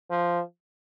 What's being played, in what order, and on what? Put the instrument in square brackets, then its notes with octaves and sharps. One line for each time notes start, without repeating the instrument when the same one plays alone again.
[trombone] F3